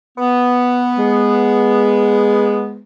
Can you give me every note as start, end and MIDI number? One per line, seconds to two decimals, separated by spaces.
0.17 2.78 59
0.98 2.83 56